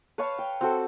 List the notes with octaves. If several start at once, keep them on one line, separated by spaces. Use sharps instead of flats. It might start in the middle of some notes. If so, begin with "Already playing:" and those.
B4 C#5 F5 A5
G5
C4 F#4 A4